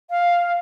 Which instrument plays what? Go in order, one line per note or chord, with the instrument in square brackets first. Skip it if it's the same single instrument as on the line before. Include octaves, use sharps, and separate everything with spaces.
[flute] F5